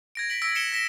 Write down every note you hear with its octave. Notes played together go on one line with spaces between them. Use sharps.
G#6 A#6 D7
B6 D7 F#7
E6 A#6 B6 D7
C#7 E7 G7
A#6 B6 E7 G7